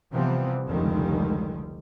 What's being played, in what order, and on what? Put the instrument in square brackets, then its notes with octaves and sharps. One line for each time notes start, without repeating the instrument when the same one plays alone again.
[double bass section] C3 E3 F3 G3 B3 C4
F1 C#2 D3 D#3 G3 G#3